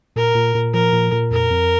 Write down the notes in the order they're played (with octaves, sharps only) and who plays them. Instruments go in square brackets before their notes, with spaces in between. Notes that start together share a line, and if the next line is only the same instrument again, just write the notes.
[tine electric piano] A#2 [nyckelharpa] A#4
[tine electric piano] A#2
A#2
[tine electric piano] F3 [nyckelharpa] A#4
[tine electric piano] A#2
A#2
[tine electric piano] F2 [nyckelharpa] A#4
[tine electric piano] F2